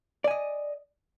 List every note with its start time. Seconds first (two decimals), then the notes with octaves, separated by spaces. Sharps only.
0.24 D5
0.28 G#5
0.31 D#5